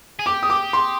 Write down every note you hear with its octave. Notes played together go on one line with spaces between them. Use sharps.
G#4
G4 D6
D#6
D6
C6